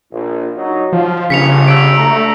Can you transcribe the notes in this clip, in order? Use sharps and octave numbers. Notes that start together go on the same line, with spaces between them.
A#1
F#3 D#4
F3 F5
G1 C#3 B6 C#7 F7
E6 D7
D2 D3 A3 A#5